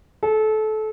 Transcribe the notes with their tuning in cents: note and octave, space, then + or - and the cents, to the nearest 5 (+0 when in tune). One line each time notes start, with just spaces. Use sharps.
A4 -25